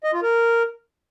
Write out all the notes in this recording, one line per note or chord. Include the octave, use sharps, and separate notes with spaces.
D#5
F4
A#4